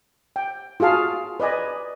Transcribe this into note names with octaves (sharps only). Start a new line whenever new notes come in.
G5
F4 F#4 G#4 F5 A5
B4 D5 D#5 G#5